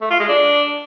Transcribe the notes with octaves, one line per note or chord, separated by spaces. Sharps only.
A3
F4
G#3
D4